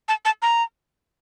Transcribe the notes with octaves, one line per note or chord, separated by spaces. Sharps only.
A5
A5
A#5